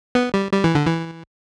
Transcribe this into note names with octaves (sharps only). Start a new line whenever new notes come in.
B3
G3
G3
E3
D3
E3